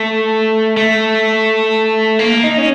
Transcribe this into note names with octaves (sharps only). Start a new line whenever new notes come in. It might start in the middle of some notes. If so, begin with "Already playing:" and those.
Already playing: A3
A3
A#3
D#4
C#4